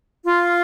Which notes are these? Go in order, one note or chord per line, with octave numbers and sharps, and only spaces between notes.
F4